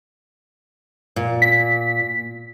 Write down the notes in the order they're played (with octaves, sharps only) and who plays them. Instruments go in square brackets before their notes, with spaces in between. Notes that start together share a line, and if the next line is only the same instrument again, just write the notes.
[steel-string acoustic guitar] A#2
[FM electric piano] B6